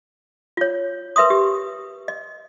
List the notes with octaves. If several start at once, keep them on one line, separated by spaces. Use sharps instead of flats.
F4 C#5
A#4 B4 E5 C6 D#6
G4
D#5